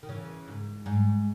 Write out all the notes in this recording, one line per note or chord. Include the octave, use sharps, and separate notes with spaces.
D#3
C#3 E3
G#2
G#2